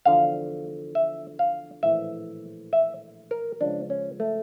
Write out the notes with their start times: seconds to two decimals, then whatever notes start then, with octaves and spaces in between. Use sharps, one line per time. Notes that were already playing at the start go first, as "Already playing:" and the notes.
0.05 E2 D3 F3 F5
0.95 E5
1.39 F5
1.83 A#1 A2 E3 E5
2.73 E5
3.31 A#4
3.61 C#2 C#3 F3 D4
3.90 C#4
4.20 A3